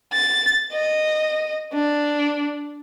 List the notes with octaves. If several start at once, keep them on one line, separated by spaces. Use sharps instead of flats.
A6
D#5
D4